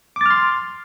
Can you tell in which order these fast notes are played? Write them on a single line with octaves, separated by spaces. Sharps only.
D6 A6 F6 C6